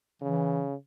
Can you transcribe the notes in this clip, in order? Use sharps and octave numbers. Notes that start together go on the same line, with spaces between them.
C#3 E3